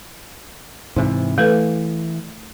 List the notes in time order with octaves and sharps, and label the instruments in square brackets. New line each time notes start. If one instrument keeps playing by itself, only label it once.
[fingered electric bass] G#2 C3 E3
[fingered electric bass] E3 [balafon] A3 A4 B4